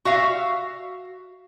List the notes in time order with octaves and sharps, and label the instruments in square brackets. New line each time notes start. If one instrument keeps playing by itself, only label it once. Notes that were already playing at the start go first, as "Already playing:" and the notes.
[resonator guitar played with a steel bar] F#4 E5 F5